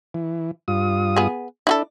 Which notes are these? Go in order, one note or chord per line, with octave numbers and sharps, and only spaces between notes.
E3
G2 F4 D#6
B3 G#4
D4 E4 F#4 A4